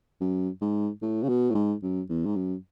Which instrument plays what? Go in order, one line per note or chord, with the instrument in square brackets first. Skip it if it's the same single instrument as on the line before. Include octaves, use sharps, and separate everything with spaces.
[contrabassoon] F#2
G#2
A2
C#3
B2
A2
G#2
F#2
E2
G#2
F#2